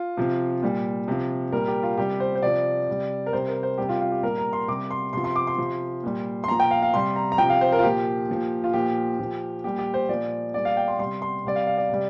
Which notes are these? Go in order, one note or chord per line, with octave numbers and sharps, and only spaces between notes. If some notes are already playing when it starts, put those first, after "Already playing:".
Already playing: F4
C3 F3
A#2 G3
C3 F3
A#2 G3 A#4
G4
F4
C3 G3 G4
C5
C5
C3 F3 D5
C3 G3
A#4
C3 G3 C5
A#4
C5
C3 G3 G4
F4
F4
G4
A#2 G3 A#4
A#5
C6
C3 G3 D6
C6
C3 F3 C6
C6
D6
C6
C3 F3
A#2 G3
C6
A#2 F3 A#5
G5
F5
F5
C3 G3 C6
A#5
A#5
C3 F3 G5
F5
C5
A#4
F4
A#2 F3 G4
A#2 F3
F4
A#2 F3 G4
A#2 F3
A#2 G3 G4
G4
C5
A#2 F3 D5
A#2 G3 D5
F5
G5
C6
C3 G3 C6
C6
C3 G3 D5
F5
F5
D5
C3 G3